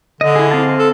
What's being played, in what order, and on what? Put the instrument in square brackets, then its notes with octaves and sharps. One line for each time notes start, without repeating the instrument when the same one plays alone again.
[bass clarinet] D3 [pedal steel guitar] D#5
[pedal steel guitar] E4 G#4
C4 F5 A5
[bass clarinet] A4